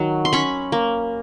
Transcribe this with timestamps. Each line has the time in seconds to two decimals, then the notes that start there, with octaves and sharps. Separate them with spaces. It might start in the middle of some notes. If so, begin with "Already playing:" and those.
Already playing: D#3 F#3
0.25 C6
0.33 C#4 B5 C#6
0.72 A#3